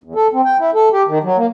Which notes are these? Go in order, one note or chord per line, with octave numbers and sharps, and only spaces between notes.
E2
A4
C4
G5
E4
A4
G4
D#3
F#3
A#3